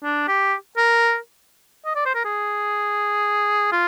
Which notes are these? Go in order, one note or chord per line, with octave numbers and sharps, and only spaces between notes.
D4
G4
A#4
D#5
D5
C5
A#4
G#4
F4